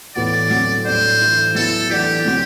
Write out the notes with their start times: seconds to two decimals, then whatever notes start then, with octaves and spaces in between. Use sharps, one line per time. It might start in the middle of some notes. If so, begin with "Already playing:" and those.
0.15 A2 E3 B3 F#4 D5
0.50 D3 F#3 A3 C4
0.85 A2 G3 D4 C5
1.20 E3 A3 E4
1.55 F#3 B3 E4 A4
1.89 E3 A3 D4 F#4 G4
2.25 D3 F#3 C4